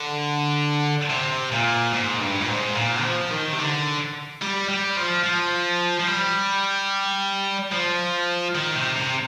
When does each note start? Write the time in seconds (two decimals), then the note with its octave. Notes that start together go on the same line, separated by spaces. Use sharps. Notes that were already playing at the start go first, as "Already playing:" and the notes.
Already playing: D3
1.10 C3
1.52 A#2
1.93 G#2
2.21 G2
2.41 A#2
2.48 G#2
2.76 A#2
3.03 F3
3.31 D#3
3.53 C3
3.59 D3
4.42 G3
4.69 G3
4.96 F3
5.24 F3
5.99 F3
6.07 G3
7.72 F3
8.55 D#3
8.76 C3
8.96 C3